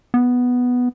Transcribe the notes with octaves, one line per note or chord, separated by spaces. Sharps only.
B3